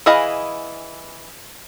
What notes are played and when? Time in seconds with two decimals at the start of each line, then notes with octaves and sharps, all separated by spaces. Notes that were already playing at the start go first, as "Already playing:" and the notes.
0.06 E3 E4 G#4 D#5 F5